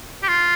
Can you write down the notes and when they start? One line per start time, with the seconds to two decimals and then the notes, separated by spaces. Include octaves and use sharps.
0.23 G4
0.28 F4